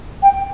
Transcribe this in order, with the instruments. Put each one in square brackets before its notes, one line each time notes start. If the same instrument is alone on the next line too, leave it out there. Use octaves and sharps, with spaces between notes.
[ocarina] G5